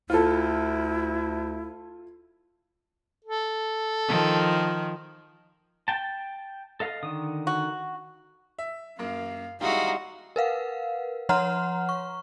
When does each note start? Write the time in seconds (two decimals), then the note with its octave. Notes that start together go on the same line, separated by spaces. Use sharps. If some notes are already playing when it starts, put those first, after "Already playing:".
0.10 D2 E4 F4 A4
3.25 A4
4.08 D#3 F3
5.88 G5 A5
6.80 A4 D#5 F5
7.03 D3 D#3 D#6
7.47 F#4
8.59 E5
8.99 F#2 A#3 F5
9.61 G3 G#3 D#4 E4 F#4 F5
10.36 A#4 B4 F5 F#5
11.29 F3 C#5 F#5 A#5 C6 F6
11.89 C#6